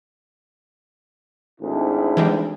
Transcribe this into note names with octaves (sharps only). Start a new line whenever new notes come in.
G#1 D2 E4
E3 G3 G#3